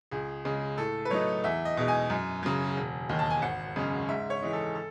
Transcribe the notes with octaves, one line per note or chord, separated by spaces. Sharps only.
C#2 G#4
C#3 G#3
A2 A4
B4
F#3 A3 D#4 C#5
E2 E5
D#5
B2 G#3 D#4
G#5
F#2
C#3 F#3
E1
D#2 D#3
A5
G#5
G#1 F#5
F#2 C#3 G#3 C#4
G#2 E5
C#5
E3 G#3 D#4
A4
A4